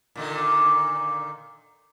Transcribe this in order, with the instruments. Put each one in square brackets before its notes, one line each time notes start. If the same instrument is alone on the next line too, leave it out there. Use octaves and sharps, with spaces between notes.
[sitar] A#2 D3 D#3